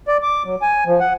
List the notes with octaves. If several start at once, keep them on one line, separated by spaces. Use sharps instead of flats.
D5
D6
F#3
G#5
F3
F#5